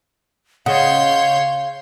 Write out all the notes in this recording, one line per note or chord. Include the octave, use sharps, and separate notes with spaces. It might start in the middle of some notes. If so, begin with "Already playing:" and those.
C#3 C#5 D#5 F5 F#5 C6 G6